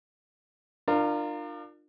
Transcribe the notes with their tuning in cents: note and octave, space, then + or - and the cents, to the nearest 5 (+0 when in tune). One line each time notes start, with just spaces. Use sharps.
D4 +35 F4 +0 A#4 -15